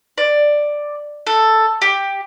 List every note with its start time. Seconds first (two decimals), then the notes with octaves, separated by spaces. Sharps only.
0.18 D5
1.27 A4
1.82 G4